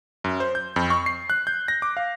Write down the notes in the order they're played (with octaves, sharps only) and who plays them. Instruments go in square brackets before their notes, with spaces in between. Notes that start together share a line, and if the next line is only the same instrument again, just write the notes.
[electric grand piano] F#2
C5
G6
F2
C#6
C7
F#6
G6
A#6
D6
F5